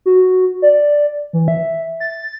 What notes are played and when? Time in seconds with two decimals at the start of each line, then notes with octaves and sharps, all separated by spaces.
0.06 F#4
0.62 D5
1.33 E3
1.48 E5
2.00 A6